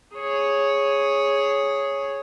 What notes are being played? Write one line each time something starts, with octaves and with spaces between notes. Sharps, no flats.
G#4 C#5